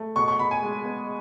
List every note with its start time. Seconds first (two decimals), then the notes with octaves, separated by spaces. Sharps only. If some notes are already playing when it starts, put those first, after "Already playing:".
Already playing: A3
0.16 B2 C#6
0.28 C#6
0.39 B2 B5
0.51 G#5
0.63 G#3
0.85 B3